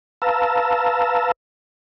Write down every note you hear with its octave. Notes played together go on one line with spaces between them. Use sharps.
B4 F5 A5 A#5 E6